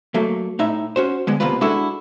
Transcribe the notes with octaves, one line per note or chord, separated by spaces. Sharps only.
F#3 A3 A#3
A2 D#4 E5
C#4 F#4 C5
D3 G#3 B3
D#2 C3 A#3 B3 F4 B4
G#3 D4 E4 F#4 A4